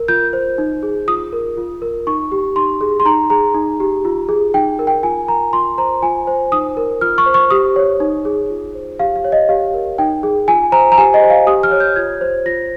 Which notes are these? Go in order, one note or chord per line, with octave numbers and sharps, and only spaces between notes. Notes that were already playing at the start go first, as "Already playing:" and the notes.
Already playing: A#4
F4 G6
C5
D#4
G#4
F4 D#6
A#4
F4
A#4
D#4 C#6
G4
D#4 C6
G#4
C6
D#4 A#5
G#4 A#5
D#4
G4
F4
G#4
D#4 G5
A#4
G5
F4 G#5
A#4 A#5
F4 C6
C5 A#5
F4 G#5
C5
D#4 D#6
A#4
F4 F6
C#6
C5
C#6
G4 D#6
C#5
D#4
G#4
F4
C5
G4 F5
F5
C#5
D#5
G4 F5
A#4
D#4 G5
G#4
F4 G#5
C5 A#5
A#5
G4 G#5
D#5
C5
F5
G4 D#6
F6
C#5
G6
F4 G#6
C5
F4 A#6